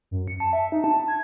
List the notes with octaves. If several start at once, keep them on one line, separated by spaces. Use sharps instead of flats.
F#2
C#7
A5
E5
D#4
A5
G#6